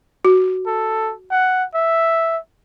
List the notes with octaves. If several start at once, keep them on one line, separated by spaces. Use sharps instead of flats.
F#4
A4
F#5
E5